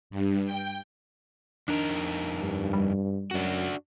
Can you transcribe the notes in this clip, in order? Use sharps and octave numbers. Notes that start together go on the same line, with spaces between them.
G2
G5
F2 D4 D#4 A#4
G2
G3
F#2 D4 F#4